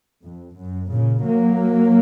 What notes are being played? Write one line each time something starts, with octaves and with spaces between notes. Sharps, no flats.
F2
F#2
A#2 C#3
F#3 A#3